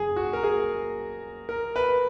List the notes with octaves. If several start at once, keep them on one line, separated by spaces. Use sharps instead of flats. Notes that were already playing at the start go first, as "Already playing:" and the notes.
Already playing: F#1 F#2 G#4
F#4
A#4
G#4
A#4
B4